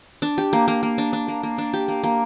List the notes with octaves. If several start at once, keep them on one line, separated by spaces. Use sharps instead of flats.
D4
G4
A#3
A#3
A#3
D4
D4
A#3
A#3
D4
G4
A#3
A#3